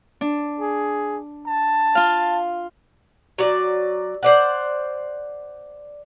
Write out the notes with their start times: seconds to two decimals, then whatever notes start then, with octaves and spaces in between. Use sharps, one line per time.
0.21 D4
0.60 G#4
1.46 A5
1.95 F4 F5
3.38 F#3 D5
4.23 C5 D5 F#5